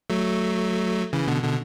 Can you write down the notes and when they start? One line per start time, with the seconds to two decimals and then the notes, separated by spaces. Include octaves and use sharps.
0.10 F#3 A3
1.13 C#3 E3
1.28 B2 D3
1.43 B2 D3